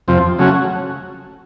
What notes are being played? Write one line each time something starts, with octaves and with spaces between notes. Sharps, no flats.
F2 C3 F3
C#3 F#3 A3 C#4 F#4